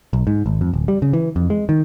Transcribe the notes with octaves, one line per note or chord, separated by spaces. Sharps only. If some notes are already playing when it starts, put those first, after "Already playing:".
B1
G#2
G#1
F2
D1
G3
C#3
E3
F2
G#3
D#3